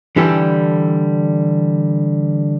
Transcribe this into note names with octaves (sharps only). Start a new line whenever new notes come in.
D3 E3 G3 G4 A4